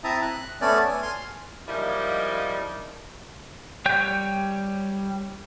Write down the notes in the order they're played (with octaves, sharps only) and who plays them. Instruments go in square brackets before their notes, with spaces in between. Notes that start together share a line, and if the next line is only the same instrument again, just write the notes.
[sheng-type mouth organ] C4 E4 E5 A5 A#5 D#6
F#6
A3 B3 C#4 A4 D5 G#5
G#5
G#5 C6 F6
[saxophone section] F3 G3 G#3 A#3 D#4 E4
[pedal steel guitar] G3 C#5 G5 G6